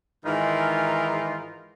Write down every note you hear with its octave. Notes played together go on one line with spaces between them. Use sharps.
G#2 D#3 E3 D#4 F4 A#4